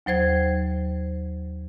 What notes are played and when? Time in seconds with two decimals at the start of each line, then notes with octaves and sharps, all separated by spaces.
0.06 D#2 F#3 C5 G#6